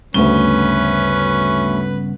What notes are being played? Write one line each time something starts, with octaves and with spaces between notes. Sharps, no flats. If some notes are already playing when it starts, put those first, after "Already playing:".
D2 G2 C#3 B3 C#4 B4 G7